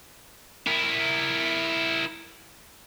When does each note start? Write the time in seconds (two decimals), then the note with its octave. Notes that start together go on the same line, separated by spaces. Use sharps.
0.67 E4 A#4